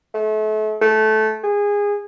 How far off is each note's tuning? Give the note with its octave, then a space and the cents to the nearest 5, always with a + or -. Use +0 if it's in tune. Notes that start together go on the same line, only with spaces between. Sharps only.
A3 -35
A3 -15
G#4 -20